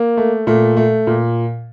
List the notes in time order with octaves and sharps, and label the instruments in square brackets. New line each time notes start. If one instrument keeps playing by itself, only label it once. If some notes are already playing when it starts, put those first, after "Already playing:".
Already playing: [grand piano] A#3
A3
A#2 A3
A3
A#2